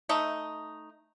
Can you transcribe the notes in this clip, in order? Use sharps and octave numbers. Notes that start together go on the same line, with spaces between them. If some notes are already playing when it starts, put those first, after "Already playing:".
A3 D#4